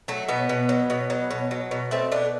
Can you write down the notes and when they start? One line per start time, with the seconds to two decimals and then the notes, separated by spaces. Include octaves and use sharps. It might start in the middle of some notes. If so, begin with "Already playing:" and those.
0.08 F#3 A3
0.28 B2 B3
0.49 B2
0.69 F#3
0.90 B2
1.10 F#3
1.31 B2
1.51 F#3
1.71 B2
1.91 A3 C4
2.12 B2 D4